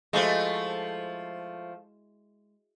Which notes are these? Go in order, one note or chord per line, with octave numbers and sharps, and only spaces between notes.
F3 G#3 A3 E4 F#4